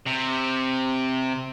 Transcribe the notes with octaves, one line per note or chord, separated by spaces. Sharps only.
C3